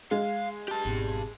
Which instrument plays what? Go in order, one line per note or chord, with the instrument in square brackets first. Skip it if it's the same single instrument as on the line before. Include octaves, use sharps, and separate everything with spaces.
[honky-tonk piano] G#3 [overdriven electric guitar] F5
[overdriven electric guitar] G4 A5
[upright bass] G#1 B2